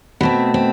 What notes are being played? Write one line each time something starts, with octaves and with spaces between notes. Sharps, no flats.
B2 A3 C4
C4